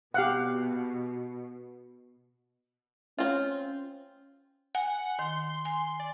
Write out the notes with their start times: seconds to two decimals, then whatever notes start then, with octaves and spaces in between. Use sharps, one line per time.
0.14 B2 G4 F5 F#5
3.19 C4 C#4 F4
4.75 F#5 G#5
5.19 D#3 C6
5.65 G#5
6.00 D5